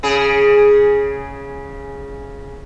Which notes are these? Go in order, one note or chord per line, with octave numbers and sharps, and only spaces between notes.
C#3 G#4